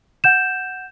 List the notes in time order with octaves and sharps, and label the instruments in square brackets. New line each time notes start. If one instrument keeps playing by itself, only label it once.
[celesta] F#5 G6 E7